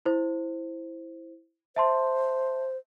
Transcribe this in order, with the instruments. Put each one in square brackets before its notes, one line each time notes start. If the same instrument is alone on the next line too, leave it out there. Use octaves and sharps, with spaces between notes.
[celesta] E4 C5
[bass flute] C5 [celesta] E5 A5 C6